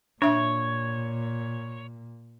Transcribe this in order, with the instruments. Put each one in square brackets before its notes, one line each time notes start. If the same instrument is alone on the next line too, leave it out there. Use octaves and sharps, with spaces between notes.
[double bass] A#2 [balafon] D4 E5 [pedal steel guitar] C#5